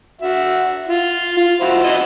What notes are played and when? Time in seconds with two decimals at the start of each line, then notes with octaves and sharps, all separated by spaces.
0.21 F#4 E5
0.87 F4
1.37 F4
1.61 E4 F#4 C5
1.84 E4 F#4 D#5